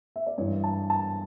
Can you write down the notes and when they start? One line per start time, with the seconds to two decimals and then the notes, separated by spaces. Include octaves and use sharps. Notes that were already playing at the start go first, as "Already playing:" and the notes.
0.16 E5
0.27 D5
0.38 G2 E3 C#5
0.64 A5
0.90 A5